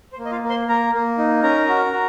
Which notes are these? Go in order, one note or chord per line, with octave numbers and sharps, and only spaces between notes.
C5
A#3
D#5
F4 F5
A#3
C5 C6
A#3 A#4 A#5
A#3
D#4
C#4 A#4 A#5
F#4
F#4